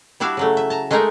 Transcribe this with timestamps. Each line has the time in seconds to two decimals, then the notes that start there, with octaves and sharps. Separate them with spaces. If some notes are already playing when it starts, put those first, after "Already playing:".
0.20 G3 D4 E4 F#4 E5 F5
0.37 C#3 F#3 A3
0.57 E5
0.70 A5 A#5
0.91 G#3 A3 D#4 G#4 A#4